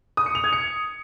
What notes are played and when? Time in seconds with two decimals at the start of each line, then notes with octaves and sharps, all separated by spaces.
0.17 D#6
0.26 C#7
0.35 F7
0.44 G#6
0.53 C#7